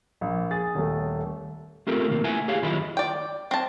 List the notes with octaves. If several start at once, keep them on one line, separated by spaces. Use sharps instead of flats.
A#1
G#4 A6
D#1 A3
A3 C4 F4 G4 A4 A#4
D#2 C3 A#3
A3 E4 B4 E5 F#5 G#5
G4 G#4 C#5 F5
F#2 D#3 E4 F4 D#5 B5
D5 G5
C4 A5